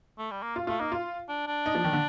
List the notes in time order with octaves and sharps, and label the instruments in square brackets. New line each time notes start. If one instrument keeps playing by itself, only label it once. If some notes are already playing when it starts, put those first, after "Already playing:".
[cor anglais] A3
G3
A#3
[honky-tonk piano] F4
[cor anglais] A3 [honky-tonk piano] F4
[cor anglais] A#3 [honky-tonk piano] D#4
[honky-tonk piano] F4
[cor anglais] D4
D4
[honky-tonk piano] D#4
F3
D#3
D3